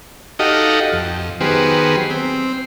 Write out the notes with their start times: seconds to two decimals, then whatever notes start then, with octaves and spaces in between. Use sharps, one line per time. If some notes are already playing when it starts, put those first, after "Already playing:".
0.39 D#4 F#4 G4 A4 D#5 F5
0.93 F2
1.41 D#3 F#3 B3 G4 G#4 C5
2.10 C4